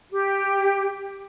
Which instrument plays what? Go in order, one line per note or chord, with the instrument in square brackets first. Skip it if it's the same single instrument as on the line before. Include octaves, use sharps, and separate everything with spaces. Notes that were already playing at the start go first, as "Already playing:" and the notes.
[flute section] G4